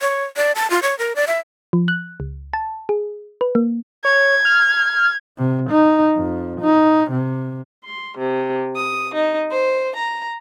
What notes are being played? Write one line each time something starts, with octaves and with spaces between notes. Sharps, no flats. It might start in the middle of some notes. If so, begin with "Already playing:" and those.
C#5
D5
A5
F4
C#5
A#4
D5
E5
F3
F#6
C#2
A5
G#4
B4
A#3
C#5 G#6
F6
C3
D#4
F2
D#4
C3
C6
C3
D#6
D#4
C5
A#5